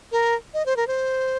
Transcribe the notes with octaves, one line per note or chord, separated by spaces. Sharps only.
A#4
D#5
C5
A#4
C5